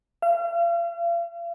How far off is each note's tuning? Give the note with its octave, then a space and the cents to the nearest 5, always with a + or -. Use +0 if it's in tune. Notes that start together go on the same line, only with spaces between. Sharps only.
F5 -40